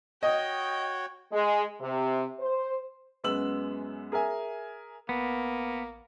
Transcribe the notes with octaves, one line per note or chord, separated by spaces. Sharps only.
F#4 C#5 D#5 G5
G#3
C3
C5
F#2 G#3 B3 E6 F#7
G#4 A#4 E5 G#5
A1 A#3 B3